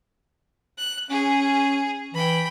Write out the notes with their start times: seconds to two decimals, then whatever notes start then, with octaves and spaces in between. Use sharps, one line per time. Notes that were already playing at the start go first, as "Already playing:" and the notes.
0.78 F#6
1.11 C#4 G#4
2.14 E3 G5 B5